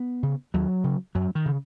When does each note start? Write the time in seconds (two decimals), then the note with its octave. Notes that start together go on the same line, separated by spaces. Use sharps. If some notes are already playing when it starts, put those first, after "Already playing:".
Already playing: B3
0.23 C#3
0.54 D#2 F#3
0.84 C#3
1.15 F#2 F#3
1.35 D#3
1.45 C#3